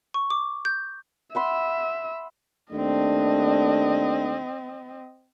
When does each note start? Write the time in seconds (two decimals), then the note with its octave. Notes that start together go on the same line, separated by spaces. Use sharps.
0.14 C#6
0.30 D6
0.65 G6
1.35 E5 F#5 B5 C6
2.72 D#2 A3 C4 D4 D#5